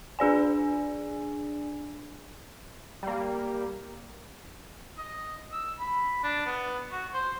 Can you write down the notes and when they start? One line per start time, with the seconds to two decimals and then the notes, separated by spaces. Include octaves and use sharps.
0.19 D4 G#4 D5 G#5
3.03 G3 A#3
4.98 D#5
5.52 E6
5.79 B5
6.24 D4
6.46 B3
6.92 F#4
7.14 C5